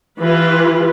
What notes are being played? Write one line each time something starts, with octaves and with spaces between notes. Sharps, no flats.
E3 F4 G4 B4